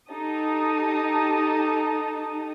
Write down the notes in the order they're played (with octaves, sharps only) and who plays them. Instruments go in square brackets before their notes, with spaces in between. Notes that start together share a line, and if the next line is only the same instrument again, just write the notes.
[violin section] D#4 G4 A4 A5 A#5 D#6